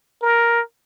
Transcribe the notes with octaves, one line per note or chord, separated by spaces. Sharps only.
A#4